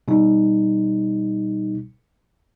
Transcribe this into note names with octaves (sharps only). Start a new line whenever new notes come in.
B2 G3 D#4